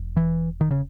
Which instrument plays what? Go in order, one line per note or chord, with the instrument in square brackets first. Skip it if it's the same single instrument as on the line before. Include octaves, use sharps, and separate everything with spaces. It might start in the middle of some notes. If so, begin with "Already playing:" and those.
Already playing: [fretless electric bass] E1
[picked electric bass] E3
D#3
C#3